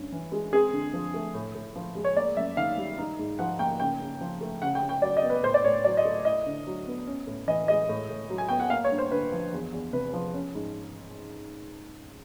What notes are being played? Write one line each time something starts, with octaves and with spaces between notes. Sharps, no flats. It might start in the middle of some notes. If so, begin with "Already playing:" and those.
Already playing: G2 C#4
E3
G#3
C4 G#4
D3
F3
A3
A2
A2
F3
G#3
C#5
A#3 D5
F#2 E5
D#3 F5
G3
D#4
G#2
F3 F#5
A#3 G5
C#3 G5
C#3
F3
A3
C#3 F#5
G5
C#3
G5
F#3 D5
D#5
B3
B4
A2 C5
D5
A2 C#5
F#3 D5
D#5
A3
E4 D#5
D3
F#3
B3
C#4
A2
E3 D#5
G#3 D#5
A2
A2
F#3
G#5
B3 G5
F#5
A#3 F5
C#5
G2
C5
D3 B4
F3
E2
E2
C3 B4
F3
C#4
G#2